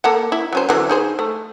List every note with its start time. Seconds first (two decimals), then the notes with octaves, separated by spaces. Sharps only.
0.04 A#3 A4 F#5
0.32 E4
0.53 F#3 C#4 C5
0.69 D3 E3 F#3
0.89 D#4 G#4 C5
1.19 A3